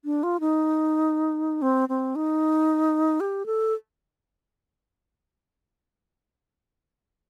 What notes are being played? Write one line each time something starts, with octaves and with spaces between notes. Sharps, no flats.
D4
F4
D#4
C4
C4
D#4
G4
A4